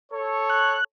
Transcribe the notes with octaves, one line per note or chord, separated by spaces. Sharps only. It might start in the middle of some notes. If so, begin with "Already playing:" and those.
A4 C#5
F#6